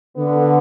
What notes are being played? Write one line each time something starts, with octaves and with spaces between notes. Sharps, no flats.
D3 B3